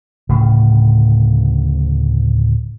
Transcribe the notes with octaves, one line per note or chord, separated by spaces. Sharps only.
D1 A2 C#3 F3